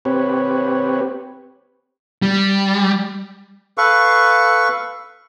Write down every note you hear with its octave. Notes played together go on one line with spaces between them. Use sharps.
C4 G4 B4 C#5
G3
A4 B4 F5 C#6